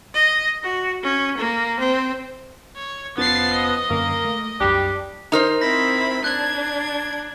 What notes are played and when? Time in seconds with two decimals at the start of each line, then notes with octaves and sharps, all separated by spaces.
0.14 D#5
0.64 F#4
1.03 C#4
1.38 A#3
1.80 C4
2.76 C#5
3.18 F1 F3 B3 C#4 A6 C7
3.53 D#5
3.90 F#2 D3 A#3 C#4
4.25 A3
4.60 C2 F#2 G3 D4 G4
5.32 D#4 A#4 C5 A#5 F6
5.62 C4 E4 B5 A#6
6.24 D4 F#6 G#6